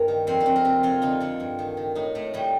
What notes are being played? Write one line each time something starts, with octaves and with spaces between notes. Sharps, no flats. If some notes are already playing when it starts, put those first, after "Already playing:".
Already playing: G2 A#3
D#3
F2 C4
D4
F2
A#4
C3
F2 F4
D3 D#4
D3 D4
G2
D#3
D#3
A2 D#4
A2 A3
A2 G3